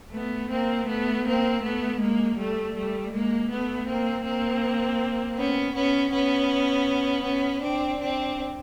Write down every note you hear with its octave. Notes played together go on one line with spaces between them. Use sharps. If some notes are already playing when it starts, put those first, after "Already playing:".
A3 B3
A#3 C4
A3 B3
A#3 C4
A3 B3
G#3 A#3
G3 A3
G3 A3
G#3 A#3
A3 B3
A#3 C4
A#3 C4
B3 C#4
B3 C#4
B3 C#4
B3 C#4
C4 D4
C4 D4